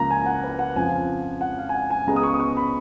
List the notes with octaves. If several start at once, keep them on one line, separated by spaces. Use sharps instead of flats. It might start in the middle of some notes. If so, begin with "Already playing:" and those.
Already playing: C#2 C#3 F3 A#3 A#5
G#5
F#5
B4
F#5
F2 C#3 F3 G#5
F#5
F5
G#5
F#5
G#5
C#2 C#3 G#3 B3 A#5
D#6
C#6
D#6
C#6
B5